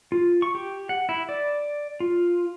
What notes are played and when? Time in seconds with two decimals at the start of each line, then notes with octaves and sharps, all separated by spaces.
0.12 F4
0.42 C#6
0.55 G4
0.89 F#5
1.09 E4
1.29 D5
2.00 F4